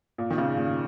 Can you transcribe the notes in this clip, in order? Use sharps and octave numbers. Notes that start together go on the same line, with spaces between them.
A#2
D#3
C#3
A#2